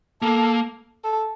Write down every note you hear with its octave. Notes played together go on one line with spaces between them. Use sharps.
A#3 A4
A4